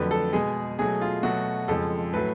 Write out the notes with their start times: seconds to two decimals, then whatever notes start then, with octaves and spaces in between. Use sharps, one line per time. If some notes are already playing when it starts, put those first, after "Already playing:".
Already playing: F2 D3 F#3 A3 B4
0.11 A4
0.33 B2 G#3 G#4
0.79 B2 F#3 A3 G#4
1.01 F4
1.23 B2 F#3 A3 F#4
1.68 F2 C#3 F3 G#3 A4
2.13 A2 F#3 A3 B4